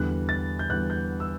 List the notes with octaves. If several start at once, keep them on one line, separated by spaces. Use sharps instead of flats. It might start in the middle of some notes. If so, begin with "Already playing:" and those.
Already playing: E2 D3 G3 F#6
A6
G6
E2 D3 G3 F#6
G6
E6